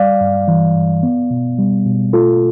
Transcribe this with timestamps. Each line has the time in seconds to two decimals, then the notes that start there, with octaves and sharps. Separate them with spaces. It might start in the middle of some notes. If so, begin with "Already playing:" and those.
Already playing: G3 D5 F5
0.21 G2
0.48 E3
0.76 G2
1.03 B3
1.31 B2
1.58 G3
1.86 B2
2.13 A3 F4 A4